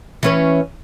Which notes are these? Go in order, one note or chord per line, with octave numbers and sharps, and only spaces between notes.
E3 C#4 B4